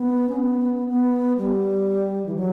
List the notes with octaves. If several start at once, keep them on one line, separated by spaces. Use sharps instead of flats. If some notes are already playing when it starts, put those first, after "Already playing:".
Already playing: B3
C#4
B3
B3
G3
E3
F#3